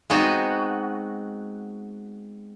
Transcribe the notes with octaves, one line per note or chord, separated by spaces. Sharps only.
G#3 B3 C4 D#4 F#4